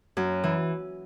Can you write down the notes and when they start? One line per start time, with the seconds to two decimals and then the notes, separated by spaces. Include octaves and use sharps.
0.17 F#2
0.44 E3